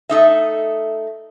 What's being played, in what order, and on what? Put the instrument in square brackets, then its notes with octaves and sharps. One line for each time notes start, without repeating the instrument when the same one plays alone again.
[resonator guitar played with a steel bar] A3 D#4 E5